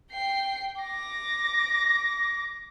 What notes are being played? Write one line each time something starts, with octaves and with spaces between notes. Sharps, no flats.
G5 C7
D6 A#6